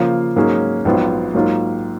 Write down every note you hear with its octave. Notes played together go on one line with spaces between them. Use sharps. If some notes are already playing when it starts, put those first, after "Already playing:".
Already playing: C#3 F3 A#3 F4
G#2 F#3 A#3 C#4 G#4
A#1 G#2 F#3 B3 F4
G#2 F#3 A#3 F4